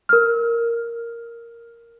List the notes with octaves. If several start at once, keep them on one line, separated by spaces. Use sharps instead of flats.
A#4 F6